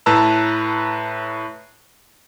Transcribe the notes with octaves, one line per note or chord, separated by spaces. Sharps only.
A2 B4 A5 A#5 E6